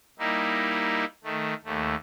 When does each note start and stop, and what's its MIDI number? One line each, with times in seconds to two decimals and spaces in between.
0.19 1.05 55
0.19 1.05 58
0.19 1.05 63
0.19 1.05 64
1.24 1.54 51
1.24 1.54 57
1.65 1.95 39
1.65 1.95 57